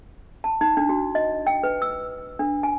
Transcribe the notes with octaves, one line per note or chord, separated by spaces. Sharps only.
A5
D#4
D4
F#4
D#5
G5
B4
E6
D4
G#5